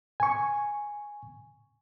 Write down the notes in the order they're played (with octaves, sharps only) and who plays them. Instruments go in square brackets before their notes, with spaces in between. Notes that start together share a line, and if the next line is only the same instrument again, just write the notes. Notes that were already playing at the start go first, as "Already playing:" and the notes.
[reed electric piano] G#5 C#6